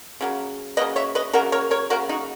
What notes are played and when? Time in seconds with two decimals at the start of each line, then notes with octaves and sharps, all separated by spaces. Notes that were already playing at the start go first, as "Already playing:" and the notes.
0.21 C#3 F#3 A#3
0.77 C#3 F#3 A#3 B4 D#5
0.96 C#5 E5
1.15 B4 D#5
1.33 C#3 F#3 A#3 F#4 A#4
1.52 A#4 C#5
1.71 A#4 C#5
1.90 C#3 F#3 A#3 F#4 A#4
2.09 D#4 F#4